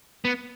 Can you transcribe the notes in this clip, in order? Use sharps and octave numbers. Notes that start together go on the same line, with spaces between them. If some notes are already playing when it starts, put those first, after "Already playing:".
B3